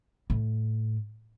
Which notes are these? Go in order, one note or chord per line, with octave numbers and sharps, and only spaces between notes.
A2